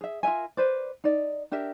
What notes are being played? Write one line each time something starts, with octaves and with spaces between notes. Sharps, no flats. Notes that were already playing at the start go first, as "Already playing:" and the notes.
G#4 E5
F4 A#4 E5 G#5
B4 C5 D5
D#4 D5
D4 G4 A#4 E5